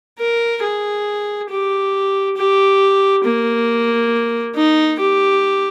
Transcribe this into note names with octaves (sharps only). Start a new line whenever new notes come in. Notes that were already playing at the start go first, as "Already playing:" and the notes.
A#4
G#4
G4
G4
A#3
D#4
G4